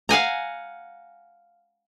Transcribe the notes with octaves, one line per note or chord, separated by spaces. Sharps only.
F5 F#5 G#5 A#5